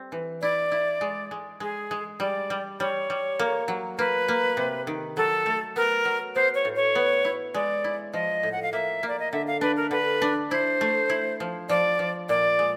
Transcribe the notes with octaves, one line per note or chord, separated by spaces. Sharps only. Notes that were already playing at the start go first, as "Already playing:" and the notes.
Already playing: G3 C4
E3
E4 D5
E4
G#3
G#3
G#3 G#4
G#3
G3 D5
G3
G3 C#5
G3
A#3
F#3
A#3 B4
A#3
C3
D#3
F#3 A4
A3
B3 A#4
F#3
B3 C5
C#5
A2
C#5
B3
E4
G#3 D5
E4
F3 D#5
A2
F#5
F5
A#3 E5
A#3
D5
D#5
D3 E5
F5
D4 B4
A#4
D3 B4
D4
E4 C5
A3
E4
F3
F3 D5
F3
A#2 D5
G#3